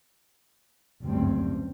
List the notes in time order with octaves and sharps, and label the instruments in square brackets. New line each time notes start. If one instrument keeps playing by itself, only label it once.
[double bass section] F#1 D2 G2 G3 C4